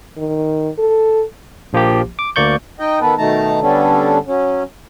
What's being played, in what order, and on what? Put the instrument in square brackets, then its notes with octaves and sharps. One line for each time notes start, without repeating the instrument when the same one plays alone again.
[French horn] D#3
A4
[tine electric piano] A#1 F3 A#3 G4
D6
D2 A#3 D5 C#6 G6
[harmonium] D#4 D#5 G5
D#3 B3 A4 B4
B2 D#3 A3 D#4 A5 A#5
D3 G3 B3 C#4 D4 A4
F#3 C#4